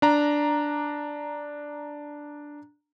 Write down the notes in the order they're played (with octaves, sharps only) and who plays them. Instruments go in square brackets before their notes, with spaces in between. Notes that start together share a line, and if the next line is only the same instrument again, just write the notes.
[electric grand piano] D4 A#5